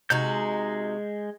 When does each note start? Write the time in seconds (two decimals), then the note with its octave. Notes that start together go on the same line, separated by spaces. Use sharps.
0.10 C3 G#3 D#4 F#4 G6